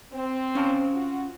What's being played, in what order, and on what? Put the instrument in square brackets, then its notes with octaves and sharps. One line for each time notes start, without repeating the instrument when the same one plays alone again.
[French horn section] C4
[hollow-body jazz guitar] C#4 F5 A5
[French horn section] F4 F#4